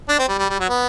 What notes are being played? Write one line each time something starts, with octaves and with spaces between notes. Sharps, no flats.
D4
C4
G3
G3
G3
F#3
B3